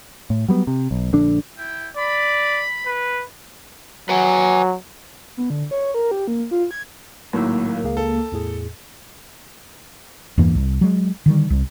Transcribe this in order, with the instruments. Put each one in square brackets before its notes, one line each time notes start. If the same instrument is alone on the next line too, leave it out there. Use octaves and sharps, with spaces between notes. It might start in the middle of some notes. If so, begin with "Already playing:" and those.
[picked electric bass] A2
F#3 G3 B3
C3
B1
A#1 D3 D4
[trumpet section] E4 G5
[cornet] D5 [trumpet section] B5
[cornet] B4
[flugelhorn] F#3 [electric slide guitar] B4 F#5 G#5
[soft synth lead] B3
D3
C#5
A#4
G4
A#3
F4
G#6
[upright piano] G#1 A2 [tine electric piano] F#3 E6 [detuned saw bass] A#3
[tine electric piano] C#2 G#4 F5
[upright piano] A4
[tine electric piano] E2 A2 G#4
[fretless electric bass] E2 G2 E3 A#3
C2
F#3 G#3
D3 D#3 G3
C2